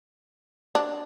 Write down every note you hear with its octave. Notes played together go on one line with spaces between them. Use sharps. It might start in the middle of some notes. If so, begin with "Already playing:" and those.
D4